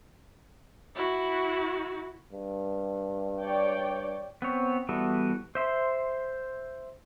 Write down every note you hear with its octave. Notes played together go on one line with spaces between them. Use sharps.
E4 F#4
G2
C#5 D5 G5
B3 C4 C#5
E3 G3 B3 F#4 A4
C5 E5 C6